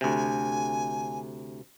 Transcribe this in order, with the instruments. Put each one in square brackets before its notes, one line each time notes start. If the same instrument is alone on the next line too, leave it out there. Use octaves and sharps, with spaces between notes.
[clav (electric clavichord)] D2 C3 [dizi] G#5